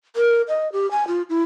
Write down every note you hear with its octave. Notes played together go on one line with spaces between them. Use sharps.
A#4
D#5
G4
G#5
F4
E4